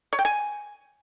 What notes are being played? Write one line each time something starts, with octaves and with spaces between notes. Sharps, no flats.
C#5
G5
G#5